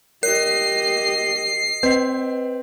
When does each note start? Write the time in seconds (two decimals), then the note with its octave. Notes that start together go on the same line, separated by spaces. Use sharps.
0.23 G4 A#4 D#5 C7
1.83 C4 B4 D#5